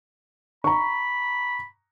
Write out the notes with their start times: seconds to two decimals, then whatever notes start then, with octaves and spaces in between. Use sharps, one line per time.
0.64 A#5 B5 C#6